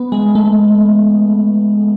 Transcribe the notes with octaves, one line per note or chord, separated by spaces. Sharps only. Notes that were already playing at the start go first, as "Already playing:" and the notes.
Already playing: B3
G#3
A3